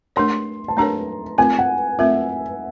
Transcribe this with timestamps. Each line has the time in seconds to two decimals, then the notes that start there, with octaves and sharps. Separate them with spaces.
0.16 A3 D4 G4 A#4 C#5 C6
0.68 A5
0.77 A3 D4 G4 A#4 C#5 A#5
1.38 A3 C4 F4 A#4 G#5
1.59 F#5
1.99 A3 C4 F4 A#4 E5